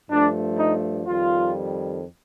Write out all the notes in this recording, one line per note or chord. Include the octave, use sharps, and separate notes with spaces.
G2 F3 A3 D4
D#4
F2 D#3 G3 F4